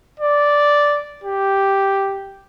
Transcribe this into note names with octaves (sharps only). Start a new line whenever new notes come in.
D5
G4